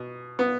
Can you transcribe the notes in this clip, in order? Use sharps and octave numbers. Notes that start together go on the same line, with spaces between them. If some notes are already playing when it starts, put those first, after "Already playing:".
Already playing: B2
B3